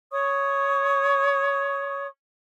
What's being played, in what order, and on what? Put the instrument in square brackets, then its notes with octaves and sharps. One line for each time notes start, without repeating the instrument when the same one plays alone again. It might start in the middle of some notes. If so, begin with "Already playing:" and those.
[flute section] C#5 C#6 D#6